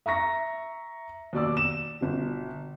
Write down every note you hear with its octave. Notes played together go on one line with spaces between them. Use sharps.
E5 A#5 C#6 A#6
D#2 B2 D5 D6 E6
E7
G1 B2